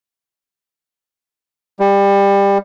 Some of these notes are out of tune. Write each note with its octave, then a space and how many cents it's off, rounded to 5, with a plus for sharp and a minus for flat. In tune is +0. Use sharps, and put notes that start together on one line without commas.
G3 +25